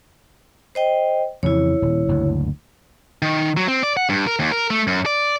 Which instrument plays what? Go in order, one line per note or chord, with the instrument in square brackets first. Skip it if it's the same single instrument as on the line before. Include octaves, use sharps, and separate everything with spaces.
[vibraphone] C5 D#5 G5
[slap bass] F2 C#3 E3 [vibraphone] E4 C#5
[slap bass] D#1
F#1 D2 G2
[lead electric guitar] D#3
F#3
C4
D5
F#5
G2
A#4
D#2
A#4
A3
F#2
D5